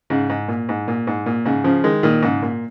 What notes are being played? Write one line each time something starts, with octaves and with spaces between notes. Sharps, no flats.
G#2 C#3
G#2
A#2
G#2
A#2
G#2
A#2
G#2 C#3
C#3 F3
D#3 G#3
A#2 D#3
G#2 C#3
A#2